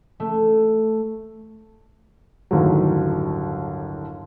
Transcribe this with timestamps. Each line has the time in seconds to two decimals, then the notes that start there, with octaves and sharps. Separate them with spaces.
0.20 A3
2.51 G1 D#2 A2 F#3